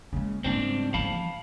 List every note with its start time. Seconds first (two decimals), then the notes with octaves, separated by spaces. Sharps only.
0.13 C#3 G#3 A#3
0.44 G#2 C#3 G3 C4 D4
0.94 E3 F3 F5 A5 B5